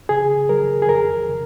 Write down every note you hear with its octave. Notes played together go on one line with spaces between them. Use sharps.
C#3 G#4
F#3 A#4
G#4
F2 A#4
C#3